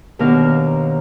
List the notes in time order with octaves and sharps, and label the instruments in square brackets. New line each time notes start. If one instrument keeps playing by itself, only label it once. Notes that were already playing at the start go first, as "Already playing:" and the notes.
[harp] D#2 B2 D4 A#4 F5